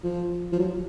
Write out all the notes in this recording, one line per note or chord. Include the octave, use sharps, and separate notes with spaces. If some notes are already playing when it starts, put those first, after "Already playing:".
F3
F3
F#3